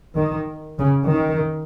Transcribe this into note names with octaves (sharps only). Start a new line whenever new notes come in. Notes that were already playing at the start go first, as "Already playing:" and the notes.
D#3
C#3
D#3